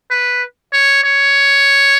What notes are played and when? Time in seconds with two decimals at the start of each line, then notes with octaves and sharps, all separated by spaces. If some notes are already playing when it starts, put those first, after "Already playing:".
0.11 B4
0.73 C#5
1.04 C#5